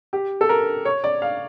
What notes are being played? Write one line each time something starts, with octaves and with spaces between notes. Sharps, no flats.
G4
A4
A#4
C#5
D5
F5